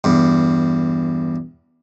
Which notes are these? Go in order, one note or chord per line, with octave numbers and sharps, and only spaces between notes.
E2 G2